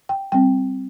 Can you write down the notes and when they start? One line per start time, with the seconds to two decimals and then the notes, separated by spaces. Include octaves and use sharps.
0.09 G5
0.32 G3 C4 G5